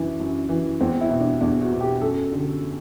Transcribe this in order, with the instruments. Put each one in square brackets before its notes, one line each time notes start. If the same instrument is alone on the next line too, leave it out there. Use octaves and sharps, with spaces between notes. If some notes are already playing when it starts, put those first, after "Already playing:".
Already playing: [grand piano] F#2 E3 D4 E4
F#2
E3
E2 C4
E4
B2
D4
E2 D4
F#4
B2
G4
F#2 A4
D3